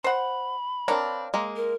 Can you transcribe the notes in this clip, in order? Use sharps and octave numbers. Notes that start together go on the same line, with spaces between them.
C5 F#5 B5
C4 D4 A#4 C#5 F5
G#3 A#3
A#4